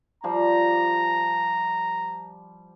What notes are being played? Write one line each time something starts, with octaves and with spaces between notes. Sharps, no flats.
F3 G3 A#5